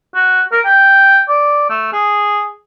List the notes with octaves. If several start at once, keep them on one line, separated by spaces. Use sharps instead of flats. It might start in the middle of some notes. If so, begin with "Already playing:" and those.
F#4
A#4
G5
D5
A3
G#4